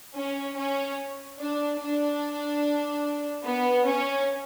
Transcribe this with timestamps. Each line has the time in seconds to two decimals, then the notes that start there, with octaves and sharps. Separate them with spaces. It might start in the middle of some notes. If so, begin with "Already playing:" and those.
0.15 C#4
0.56 C#4
1.38 D4
1.80 D4
3.45 B3
3.85 C#4